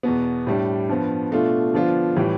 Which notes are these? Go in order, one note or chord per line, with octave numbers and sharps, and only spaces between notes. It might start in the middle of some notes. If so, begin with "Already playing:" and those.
E2 B2 B3
A2 G3 D4
G2 F3 B3
B2 A3 D4 F4
D3 F3 B3 D4 F4
A2 E3 G3